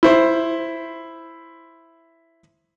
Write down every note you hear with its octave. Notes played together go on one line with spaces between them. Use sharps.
E4 C5 C6